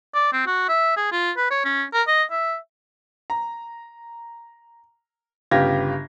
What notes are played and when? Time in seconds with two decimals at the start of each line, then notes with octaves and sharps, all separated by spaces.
0.14 D5
0.33 C4
0.47 F#4
0.69 E5
0.97 G#4
1.12 F4
1.37 B4
1.51 C#5
1.65 C#4
1.93 A#4
2.08 D#5
2.31 E5
3.30 A#5
5.51 G1 C#3 F4 G4 G#6 A#6